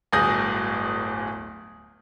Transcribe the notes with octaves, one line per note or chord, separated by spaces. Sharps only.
D1 G1 G#4 D#6 G6 A#6